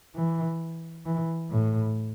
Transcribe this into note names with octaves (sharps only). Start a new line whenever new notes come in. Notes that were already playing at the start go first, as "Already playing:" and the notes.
E3
E3
A2